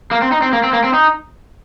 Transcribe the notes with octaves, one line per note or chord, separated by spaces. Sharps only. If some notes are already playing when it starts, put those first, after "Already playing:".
A#3
C4
D#4
C4
A#3
C4
A#3
C4
D#4